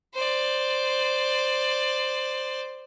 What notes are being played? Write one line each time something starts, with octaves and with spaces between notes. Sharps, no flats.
C5 D5